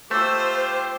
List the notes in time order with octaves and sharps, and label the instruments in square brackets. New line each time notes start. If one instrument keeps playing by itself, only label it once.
[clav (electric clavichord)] A3 [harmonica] F4 G4 D6 [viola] C5 [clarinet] E6